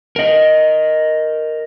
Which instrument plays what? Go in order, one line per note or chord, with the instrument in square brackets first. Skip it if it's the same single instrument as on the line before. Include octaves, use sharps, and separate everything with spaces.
[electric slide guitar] A#4 D#5